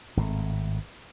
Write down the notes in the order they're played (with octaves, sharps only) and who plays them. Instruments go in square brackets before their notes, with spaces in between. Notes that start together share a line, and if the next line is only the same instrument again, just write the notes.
[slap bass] G#1 A2